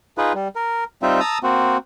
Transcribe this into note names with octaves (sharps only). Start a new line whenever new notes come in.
D#4 F4 G#4 B4
G3
A#4
G3 C4 D#4 F4 E5
A5 A#5 D#6 E6
A#3 C4 F#4